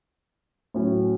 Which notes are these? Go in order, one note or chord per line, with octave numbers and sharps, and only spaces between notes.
A2 F#3 C#4 E4